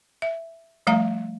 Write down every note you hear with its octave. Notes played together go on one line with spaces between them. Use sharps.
E5
F3 G3 A3 F5 A#5